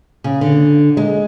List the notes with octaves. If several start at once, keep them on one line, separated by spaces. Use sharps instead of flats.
C#3
D3
G#3